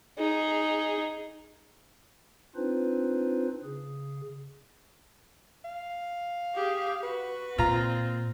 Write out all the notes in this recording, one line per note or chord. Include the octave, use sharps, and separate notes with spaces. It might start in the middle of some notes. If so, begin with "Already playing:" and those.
D#4 G#4
C4 D4 D#4 F4 B4 C5
C#3 G#4
F5
G4 G#4
F#4 B4
A#2 C4 F4 A#5